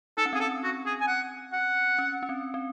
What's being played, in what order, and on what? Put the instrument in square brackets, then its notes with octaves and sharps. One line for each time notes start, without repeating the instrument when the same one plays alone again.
[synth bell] D#4 [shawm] A4
[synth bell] C#4
[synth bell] C4 [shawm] G#4
[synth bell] C#4 [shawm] A4
[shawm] F#4
G#4
G#5
F#5
F#5
[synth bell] C#4
C#4
C4
C4